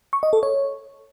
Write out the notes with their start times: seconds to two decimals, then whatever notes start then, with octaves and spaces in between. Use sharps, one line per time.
0.13 C#6
0.23 D#5
0.33 A4
0.43 C#5